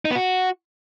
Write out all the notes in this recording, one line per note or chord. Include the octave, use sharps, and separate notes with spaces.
D#4
B3
F#4